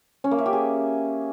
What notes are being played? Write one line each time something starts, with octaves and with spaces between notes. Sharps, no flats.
C#4
A#3
E5
G4
G#4